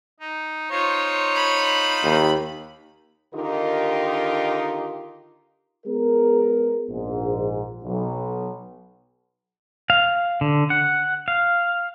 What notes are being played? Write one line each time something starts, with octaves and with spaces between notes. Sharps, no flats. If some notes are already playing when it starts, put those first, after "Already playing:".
D#4
D#4 F4 C5 C#5
B5
D#2
D3 D#3 D#4 F4 G4 A#4
G#3 B3 G#4 A#4
A#1 G#2
B1
F5
D3
F#5
F5